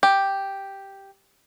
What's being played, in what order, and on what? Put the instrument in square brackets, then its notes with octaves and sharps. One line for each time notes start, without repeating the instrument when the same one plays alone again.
[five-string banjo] G4